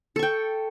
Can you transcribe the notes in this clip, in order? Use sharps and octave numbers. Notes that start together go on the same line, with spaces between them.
A4 G5 C#6